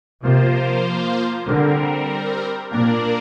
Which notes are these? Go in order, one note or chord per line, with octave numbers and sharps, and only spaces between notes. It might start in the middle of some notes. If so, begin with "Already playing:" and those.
C3 F3 A#3 F4 C5
D3 G3 C4 A#4
A#2 A#3 D4 A#4 D5